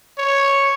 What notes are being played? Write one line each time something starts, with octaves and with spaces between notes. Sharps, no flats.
C#5